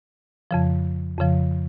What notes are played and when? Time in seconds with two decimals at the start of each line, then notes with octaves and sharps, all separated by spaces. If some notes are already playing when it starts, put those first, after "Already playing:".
0.51 F2 C#3 F3
1.18 F2 C#3 F3